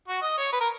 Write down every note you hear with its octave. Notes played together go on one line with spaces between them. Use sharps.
F#4
D#5
C#5
B4
A#4